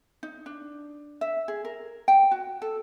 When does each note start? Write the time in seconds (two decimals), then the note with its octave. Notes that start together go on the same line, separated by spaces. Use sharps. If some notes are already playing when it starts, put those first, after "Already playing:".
0.23 D#4
0.46 D4
1.21 E5
1.48 G#4
1.65 A#4
2.08 G5
2.31 F#4
2.62 A4